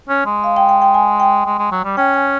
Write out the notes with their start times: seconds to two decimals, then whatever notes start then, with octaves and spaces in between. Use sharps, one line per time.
0.09 C#4
0.26 G#3
0.44 F5
0.57 G5
0.69 G5
0.82 G5
0.94 G#5
1.20 G5
1.46 G#3
1.58 G#3
1.71 F#3
1.84 G3
1.97 C#4 G5
2.14 G#5